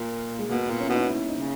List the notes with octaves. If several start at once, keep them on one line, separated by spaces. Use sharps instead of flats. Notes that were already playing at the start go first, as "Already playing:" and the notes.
Already playing: A#2 A#3
G#3
B2 A#3
B3
A#2
C#4
E4
B2
D#4
E4
D#4
C#3